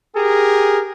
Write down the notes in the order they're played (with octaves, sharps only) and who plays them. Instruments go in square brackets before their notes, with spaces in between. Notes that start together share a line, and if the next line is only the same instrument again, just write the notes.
[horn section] G4 G#4 A#4